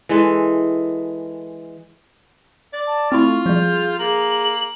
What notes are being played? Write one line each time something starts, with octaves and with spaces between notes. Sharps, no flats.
E3 G#3 A4
D5
A5
A3 C4 E4 F4 C#6
F3 G3 G#4 G6
A#3 G#4 F#7